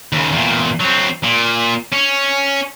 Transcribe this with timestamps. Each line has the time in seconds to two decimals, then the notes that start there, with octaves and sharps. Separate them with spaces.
0.13 D#2 C#3
0.32 E2 A#2
0.80 F#3 C4
1.23 A#2
1.92 C#4